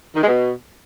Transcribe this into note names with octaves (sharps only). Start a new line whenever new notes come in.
D#3
G#3
B2